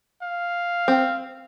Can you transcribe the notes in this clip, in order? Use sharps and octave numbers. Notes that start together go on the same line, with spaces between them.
F5
C4